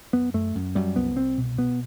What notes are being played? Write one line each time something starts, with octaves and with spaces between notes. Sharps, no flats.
F#2 B3
F#2 A3
F#2
F#2 G3
C2 B3
C2 C4
B2
B2 B3